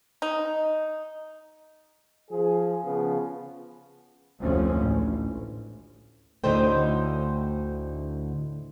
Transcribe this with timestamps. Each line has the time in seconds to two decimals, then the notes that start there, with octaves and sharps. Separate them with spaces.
0.22 D#4
2.31 F3 G#4
2.84 C#3 F3 B3
4.43 F1 D2 C3 F3 G#3 C#4
4.80 A1
6.44 D2 A2 D3 D#4 C5 G5